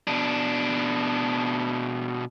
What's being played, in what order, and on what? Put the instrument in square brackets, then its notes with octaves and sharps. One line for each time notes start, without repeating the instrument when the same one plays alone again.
[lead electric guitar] B2 D4